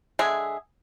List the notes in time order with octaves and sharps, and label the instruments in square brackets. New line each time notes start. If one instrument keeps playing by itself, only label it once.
[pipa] D3 G#3 G#4 E5